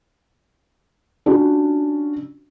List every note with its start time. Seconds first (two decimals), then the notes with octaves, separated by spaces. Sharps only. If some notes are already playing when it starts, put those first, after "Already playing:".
1.26 C#4 D4 F4 F#4